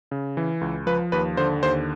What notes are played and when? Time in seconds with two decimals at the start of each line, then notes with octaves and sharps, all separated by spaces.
0.11 C#3
0.37 E3
0.61 C#2
0.87 F3 B4
1.12 D#2 B4
1.37 D3 C5
1.63 D#2 C5